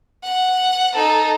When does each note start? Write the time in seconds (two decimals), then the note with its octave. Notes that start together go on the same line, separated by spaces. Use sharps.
0.24 F#5
0.95 D#4 A4